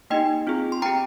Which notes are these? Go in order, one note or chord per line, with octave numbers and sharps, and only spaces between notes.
A#3 D#4 G4 D#5 G5
C4 F4 G#4
C6
C4 G4 G5 A#5